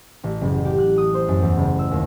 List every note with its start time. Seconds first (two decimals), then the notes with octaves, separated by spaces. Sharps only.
0.24 A1
0.41 F#1
0.65 G4
0.79 F#6
0.98 D#6
1.14 C5
1.28 F#2
1.42 E2
1.57 F#1
1.79 E6
1.91 D#2